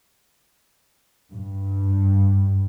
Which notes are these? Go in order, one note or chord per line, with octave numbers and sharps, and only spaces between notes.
G2